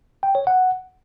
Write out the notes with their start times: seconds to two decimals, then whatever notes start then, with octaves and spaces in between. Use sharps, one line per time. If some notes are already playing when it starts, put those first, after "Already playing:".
0.23 G5
0.35 C#5
0.47 F#5